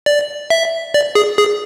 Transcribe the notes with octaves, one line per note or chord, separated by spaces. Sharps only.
D5
E5
D5
G#4
G#4